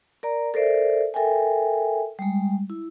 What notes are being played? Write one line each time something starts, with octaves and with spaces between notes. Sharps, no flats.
A#4 D5 A#5
A4 A#4 C5 D5 E5
A4 A#4 E5 G5 G#5
G3 G#3
E4